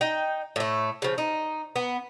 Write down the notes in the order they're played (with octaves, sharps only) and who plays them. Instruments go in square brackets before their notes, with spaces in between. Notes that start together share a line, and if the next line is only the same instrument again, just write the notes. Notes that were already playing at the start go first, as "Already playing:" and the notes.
[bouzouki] D#4 G5
A2 A3
C#3 F3
D#4
B3